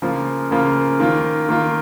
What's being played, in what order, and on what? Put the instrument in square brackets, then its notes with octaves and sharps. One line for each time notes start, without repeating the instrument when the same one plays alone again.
[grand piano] C#3 F3 A#3 F4
C#3 F3 A#3 F4
D#3 A#3 F4
D#3 A#3 F4